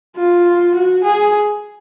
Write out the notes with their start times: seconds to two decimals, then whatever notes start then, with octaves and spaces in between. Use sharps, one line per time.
0.16 F4
0.75 F#4
1.04 G#4